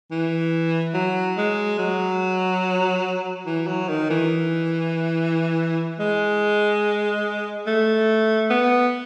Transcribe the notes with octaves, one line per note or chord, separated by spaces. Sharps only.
E3
F#3
G#3
F#3
E3
F#3
D#3
E3
G#3
A3
B3